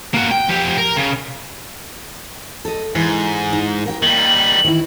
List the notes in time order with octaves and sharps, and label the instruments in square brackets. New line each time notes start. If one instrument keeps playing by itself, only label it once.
[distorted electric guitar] A#3 F#4
G5
F3 G4
A#4
C#3
[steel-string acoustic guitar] A4 D#5
[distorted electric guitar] G#2 [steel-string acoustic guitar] E3
[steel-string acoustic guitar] D#4
A#4 F#5 G5
[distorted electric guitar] D#3 G3 [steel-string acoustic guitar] A#3 [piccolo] F#7
[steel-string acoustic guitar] D#3 E3 E4